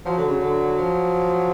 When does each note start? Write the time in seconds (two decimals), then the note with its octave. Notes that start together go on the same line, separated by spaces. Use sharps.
0.05 F3 F#3
0.17 D3
0.28 C#3
0.40 D3
0.78 F3